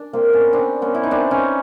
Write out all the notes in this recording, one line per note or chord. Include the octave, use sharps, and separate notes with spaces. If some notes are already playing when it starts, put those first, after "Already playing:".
Already playing: D4
A#3 C4
B3 C#4
C4 D4
B3 C#4
E4
D#4
C4 D4
C#4 D#4